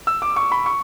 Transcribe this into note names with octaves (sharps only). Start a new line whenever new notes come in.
E6
D6
C#6
B5
C#6